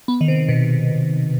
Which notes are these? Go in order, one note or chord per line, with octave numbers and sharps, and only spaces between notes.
B3
D#3
C3
B2